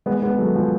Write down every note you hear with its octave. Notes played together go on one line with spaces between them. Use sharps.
G#3 B3
G#3 B3
F#3 A3
F3 G#3